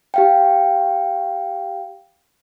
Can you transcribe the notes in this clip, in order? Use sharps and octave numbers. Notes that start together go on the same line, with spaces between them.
G4 F5 G5